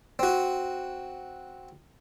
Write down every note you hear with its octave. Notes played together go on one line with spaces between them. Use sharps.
C4 F#4